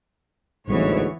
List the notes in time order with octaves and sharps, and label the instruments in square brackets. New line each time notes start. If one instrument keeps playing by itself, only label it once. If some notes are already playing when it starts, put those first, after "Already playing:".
[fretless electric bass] A1 G3 C4 [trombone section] D2 G#2 [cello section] E3 B3 C#5